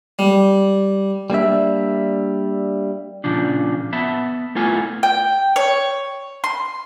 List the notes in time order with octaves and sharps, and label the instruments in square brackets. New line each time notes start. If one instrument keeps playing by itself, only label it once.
[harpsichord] G3
[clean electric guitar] G3 A#3 D4 E5
A#2 C#3 F3 D4
B3 E5 A5 B5
A3 B3 E4 F4 G#5
[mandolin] G5
C#5
C6